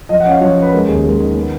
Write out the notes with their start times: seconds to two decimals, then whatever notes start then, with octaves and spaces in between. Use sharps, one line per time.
0.09 F3 D#5
0.20 F#5
0.26 C#4
0.31 F5
0.41 F3 C#5
0.57 C#4 B4
0.72 G#3 A#4
0.88 D#2 G#4
1.04 G#3 A#4
1.20 D#3
1.36 B3